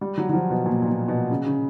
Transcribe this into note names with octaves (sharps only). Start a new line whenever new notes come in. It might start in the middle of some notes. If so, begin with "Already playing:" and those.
G3
F#3
F#3
F3
B2
A#2
A#2
B2
B2
C#3
C#3